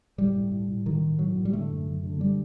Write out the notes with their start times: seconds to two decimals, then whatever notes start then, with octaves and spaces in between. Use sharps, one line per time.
0.18 A2 G3
0.35 A2
0.52 A2
0.68 A2
0.86 A2 D#3
1.03 A2
1.19 A2 F#3
1.36 A2
1.45 G3
1.53 D3 A3
1.70 F#2
1.87 F#2
2.03 D3
2.20 D3 G3